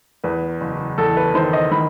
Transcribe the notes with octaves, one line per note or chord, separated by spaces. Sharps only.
E2 B4
F#1
E2 A4
B4
D#3 C5
D#5
D#3 B5